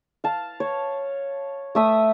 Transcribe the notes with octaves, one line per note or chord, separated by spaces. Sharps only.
F5 A5
C#5
A3 E5 D#6